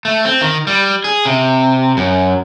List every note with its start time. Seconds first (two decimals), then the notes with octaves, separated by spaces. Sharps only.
0.05 A3
0.25 C4
0.41 D#3
0.67 G3
1.04 G#4
1.25 C3
1.97 F#2